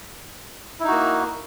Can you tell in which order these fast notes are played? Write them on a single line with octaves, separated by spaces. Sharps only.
E4 D#4 F#4 A#3